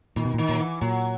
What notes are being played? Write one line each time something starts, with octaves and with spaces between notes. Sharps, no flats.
A#2 D#3
B2
A#2
D#3
A#2 F#3
E3
A#2 F#3